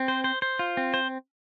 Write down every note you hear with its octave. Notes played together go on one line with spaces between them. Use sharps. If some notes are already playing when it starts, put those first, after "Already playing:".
Already playing: C4
C5
C5
C5
F4
C4
C5